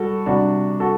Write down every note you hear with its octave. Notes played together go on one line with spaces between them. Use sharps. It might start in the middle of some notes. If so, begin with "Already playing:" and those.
Already playing: G3 F#4 A4
C3 G3 D4 F#4
F#4 A4